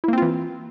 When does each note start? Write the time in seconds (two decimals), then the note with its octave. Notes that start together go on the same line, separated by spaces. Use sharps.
0.04 E4
0.08 A#3
0.13 C4
0.18 F4
0.22 E3